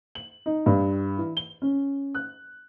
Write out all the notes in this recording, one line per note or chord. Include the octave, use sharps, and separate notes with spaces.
F#7
D#4
G2
E3
G7
C#4
F#6